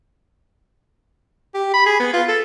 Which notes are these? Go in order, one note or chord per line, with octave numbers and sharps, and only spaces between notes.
G4
B5
G#4
B3
F4
A4